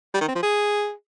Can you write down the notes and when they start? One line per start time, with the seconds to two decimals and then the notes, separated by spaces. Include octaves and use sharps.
0.14 G3
0.21 D#3
0.28 C4
0.35 F3
0.43 G#4